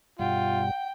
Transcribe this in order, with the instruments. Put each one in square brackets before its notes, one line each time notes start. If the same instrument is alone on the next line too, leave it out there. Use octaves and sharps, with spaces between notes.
[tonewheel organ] G2 B2 G3 [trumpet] F4 [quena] F#5 [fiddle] G5